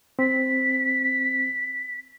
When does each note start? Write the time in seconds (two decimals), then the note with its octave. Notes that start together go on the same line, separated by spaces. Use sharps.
0.19 C4 B6